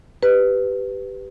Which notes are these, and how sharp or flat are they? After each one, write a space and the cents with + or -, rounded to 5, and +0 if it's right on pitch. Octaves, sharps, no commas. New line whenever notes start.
G4 -5 B4 +10